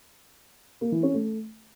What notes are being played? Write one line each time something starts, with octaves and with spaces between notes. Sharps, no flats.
A#3
E3
C#4
A3